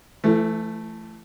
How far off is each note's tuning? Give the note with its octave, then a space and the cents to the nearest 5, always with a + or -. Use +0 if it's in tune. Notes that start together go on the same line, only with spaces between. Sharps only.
E3 +40 A3 +0 E4 -20